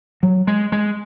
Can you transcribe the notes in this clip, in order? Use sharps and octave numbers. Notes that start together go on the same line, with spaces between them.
F#3
G#3
G#3